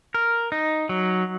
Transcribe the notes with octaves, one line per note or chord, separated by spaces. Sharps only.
A#4
D#4
F#3